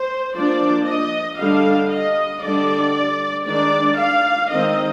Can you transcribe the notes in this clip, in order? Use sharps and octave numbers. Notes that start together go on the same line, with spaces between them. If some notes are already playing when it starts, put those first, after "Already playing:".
Already playing: C5
F3 A#3 D4 D5
D#5
D3 G3 D4 F5
D#5
D3 G3 D4 D5
D#3 G#3 D4 D5
F5
D#3 G#3 C4 D#5